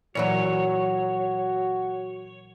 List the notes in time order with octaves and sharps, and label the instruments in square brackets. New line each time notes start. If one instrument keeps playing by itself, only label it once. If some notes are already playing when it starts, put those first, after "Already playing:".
[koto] A#2 E3 F#3 [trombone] F#4 [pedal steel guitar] C#5